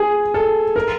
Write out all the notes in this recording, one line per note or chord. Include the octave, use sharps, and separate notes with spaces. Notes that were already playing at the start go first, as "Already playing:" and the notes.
Already playing: G#4
A4
A#4